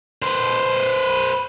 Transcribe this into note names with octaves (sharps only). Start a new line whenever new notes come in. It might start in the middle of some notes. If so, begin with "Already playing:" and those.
B4 C5